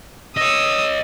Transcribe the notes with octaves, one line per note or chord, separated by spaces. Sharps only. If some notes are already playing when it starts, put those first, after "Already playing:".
C#5 D#5 D#6 E6